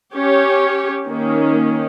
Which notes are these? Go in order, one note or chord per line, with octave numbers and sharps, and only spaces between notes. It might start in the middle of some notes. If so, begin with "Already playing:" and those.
C#4 G4 C#5
D#3 A#3 C#4